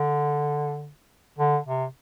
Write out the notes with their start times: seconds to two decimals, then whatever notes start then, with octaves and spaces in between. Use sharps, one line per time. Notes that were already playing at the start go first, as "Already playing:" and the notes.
Already playing: D3
1.38 D3
1.66 C3